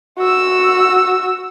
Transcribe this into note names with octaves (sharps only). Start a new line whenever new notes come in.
F#4 E6